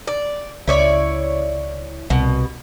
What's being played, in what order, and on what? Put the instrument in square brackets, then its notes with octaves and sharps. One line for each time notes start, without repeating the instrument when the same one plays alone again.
[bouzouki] D5
[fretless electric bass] C#2 [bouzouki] E4 C#5 D5
[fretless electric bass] C2 [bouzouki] B2